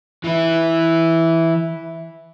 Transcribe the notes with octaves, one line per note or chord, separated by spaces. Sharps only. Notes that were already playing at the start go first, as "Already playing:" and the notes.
E3 E4